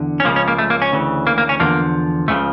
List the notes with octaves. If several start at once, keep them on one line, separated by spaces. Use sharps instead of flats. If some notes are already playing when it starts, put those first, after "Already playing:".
Already playing: E2 D3
C#4
C#2 C#3 F3 A#3
C#4
A#3
A3
A#3
C#4
D2 C#3 E3
A#3
A#3
C#4
E2 D3 F3 A#3
C#2 C#3 F3 A3